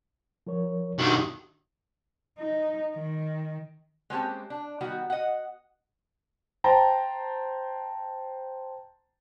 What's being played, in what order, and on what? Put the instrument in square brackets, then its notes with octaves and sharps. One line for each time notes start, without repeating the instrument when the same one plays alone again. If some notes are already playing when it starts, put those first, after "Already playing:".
[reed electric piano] F3 A#4 C#5
[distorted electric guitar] B1 D#3 [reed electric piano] D4 F#4 G4
[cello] D#4
D#3
[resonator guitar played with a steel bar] G#3 A#3 C4 C#4 G4 A5
D4
D#3 G3 B3 F#4
D#5 F#5
[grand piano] C5 G5 A5 A#5